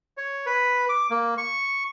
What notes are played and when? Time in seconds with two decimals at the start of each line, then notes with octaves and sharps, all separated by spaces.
0.17 C#5
0.46 B4
0.89 D6
1.11 A#3
1.38 C#6